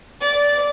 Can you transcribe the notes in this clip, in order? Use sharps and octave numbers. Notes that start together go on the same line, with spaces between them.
D5